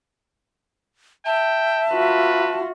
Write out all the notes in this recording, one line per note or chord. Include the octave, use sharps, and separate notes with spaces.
E5 G5 A5
F4 F#4 B4